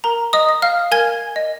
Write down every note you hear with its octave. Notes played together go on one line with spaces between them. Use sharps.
A#4 A#5
D#5 D#6
D#5
F5 F6
A#4 G#5 G#6
D#5